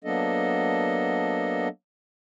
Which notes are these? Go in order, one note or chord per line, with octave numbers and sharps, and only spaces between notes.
F#3 A#3 B3 D4 A4 D#5